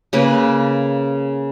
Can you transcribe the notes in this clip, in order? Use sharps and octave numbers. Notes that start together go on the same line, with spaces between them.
C#3 A#3 B4